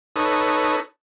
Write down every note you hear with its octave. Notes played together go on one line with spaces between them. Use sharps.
D#4 A4 B4 C#5 D#6